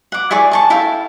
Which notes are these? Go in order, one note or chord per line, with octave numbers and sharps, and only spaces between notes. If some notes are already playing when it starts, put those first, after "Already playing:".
F#5 D6
E4 G#4 D5 C#6
G#4 A5 C#6
E4 A4 F5 G5